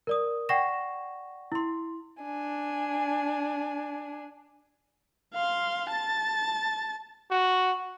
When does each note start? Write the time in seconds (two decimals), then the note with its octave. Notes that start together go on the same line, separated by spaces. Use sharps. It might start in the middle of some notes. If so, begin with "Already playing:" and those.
0.07 A#4 D5 D#6
0.49 D5 F#5 G5 C#6 A#6 E7
1.52 E4 C6
2.22 D4 G#5
5.34 F5 C6
5.90 A5 A6
7.31 F#4